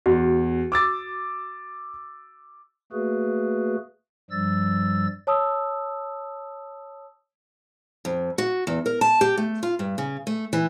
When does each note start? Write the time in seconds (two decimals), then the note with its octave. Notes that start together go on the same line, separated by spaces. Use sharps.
0.06 E2 F#4
0.72 D6 E6 A6
2.92 A3 A#3 F#4 G#4 B4
4.31 G2 F3 G3 E6 A6
5.27 C#5 A5 D#6 E6
8.05 F2
8.38 F#4
8.67 E2
8.86 A#4
9.01 A5
9.21 G4
9.37 A3
9.63 F4
9.79 G2
9.98 C#3
10.27 A3
10.53 E3